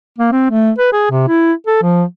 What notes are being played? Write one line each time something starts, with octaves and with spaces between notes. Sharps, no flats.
A#3
C4
A3
B4
G#4
C3
E4
A4
F3